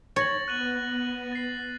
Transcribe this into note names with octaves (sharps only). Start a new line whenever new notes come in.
C#5 A6 A#6 F#7
B3 F#6 D#7 F#7
A6 C7